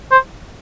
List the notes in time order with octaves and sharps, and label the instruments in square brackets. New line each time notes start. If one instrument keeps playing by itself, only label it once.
[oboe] C5